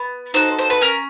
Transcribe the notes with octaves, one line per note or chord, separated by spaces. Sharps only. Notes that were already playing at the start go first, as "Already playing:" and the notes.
Already playing: B3
D#4 F#4 A4 C5
C5
B4
C#4 A#4